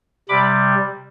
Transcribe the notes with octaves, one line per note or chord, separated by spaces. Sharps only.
C3 G3 B5 D6